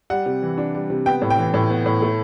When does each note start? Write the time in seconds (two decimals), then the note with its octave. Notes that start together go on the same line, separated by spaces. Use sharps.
0.10 G3 F#5
0.26 C3
0.43 E3
0.58 D4
0.75 G3
0.90 C3
1.06 B3 G5
1.22 A2
1.30 G5
1.38 E3
1.54 A2
1.70 B3
1.86 A2
2.02 A3